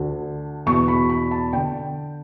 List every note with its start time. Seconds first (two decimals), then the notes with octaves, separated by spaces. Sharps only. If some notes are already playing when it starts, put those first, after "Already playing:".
Already playing: D2 D3
0.66 E2 B2 C#6
0.88 B5
1.10 B5
1.31 A5
1.53 D3 G5